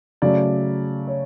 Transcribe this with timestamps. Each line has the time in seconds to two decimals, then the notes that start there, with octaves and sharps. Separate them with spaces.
0.22 C#3 F#3 A3 D5
1.07 C#5